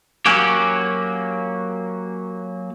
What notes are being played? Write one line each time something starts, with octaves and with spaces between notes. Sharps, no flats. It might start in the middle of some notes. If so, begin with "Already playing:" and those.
F#3 A#3 C#4 F#4 G4